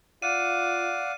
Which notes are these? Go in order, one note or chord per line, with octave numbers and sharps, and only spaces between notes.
F4 D5 F5 F#5 D#7